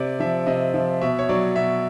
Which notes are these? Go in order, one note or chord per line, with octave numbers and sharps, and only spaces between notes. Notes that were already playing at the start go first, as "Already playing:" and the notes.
Already playing: C3 D5
F3 E5
C3 D#5
F3
B2 E5
C#5
F#3 D5
B2 E5